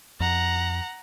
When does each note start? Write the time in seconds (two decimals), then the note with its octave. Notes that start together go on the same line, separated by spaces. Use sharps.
0.20 F2 F#5 A#5